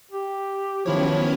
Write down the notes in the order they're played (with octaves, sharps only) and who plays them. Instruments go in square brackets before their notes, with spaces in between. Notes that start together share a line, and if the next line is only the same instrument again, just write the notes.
[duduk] G4
[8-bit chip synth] D#3 E4 C#5 [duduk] F3 [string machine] F#3 B3 C#4